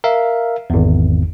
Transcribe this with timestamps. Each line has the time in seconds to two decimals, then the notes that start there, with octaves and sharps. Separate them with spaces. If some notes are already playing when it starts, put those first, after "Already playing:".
0.04 A#4 E5 F5
0.70 G#1 E2